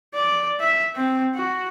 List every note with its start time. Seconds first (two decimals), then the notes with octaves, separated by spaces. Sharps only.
0.14 D5
0.60 E5
0.96 C4
1.35 F#4